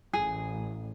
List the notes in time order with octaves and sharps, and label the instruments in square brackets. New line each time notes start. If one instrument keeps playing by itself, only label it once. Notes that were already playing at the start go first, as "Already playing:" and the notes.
[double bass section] A1 [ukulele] G#4